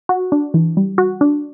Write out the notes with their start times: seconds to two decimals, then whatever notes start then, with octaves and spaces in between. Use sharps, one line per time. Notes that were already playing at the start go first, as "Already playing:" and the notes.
0.09 F#4
0.32 D4
0.54 E3
0.77 G3
0.98 F#4
1.21 D4